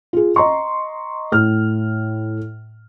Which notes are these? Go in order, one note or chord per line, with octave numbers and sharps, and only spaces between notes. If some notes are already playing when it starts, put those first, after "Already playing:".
F4 G#4
D#5 A#5 C6 C#6
A2 F6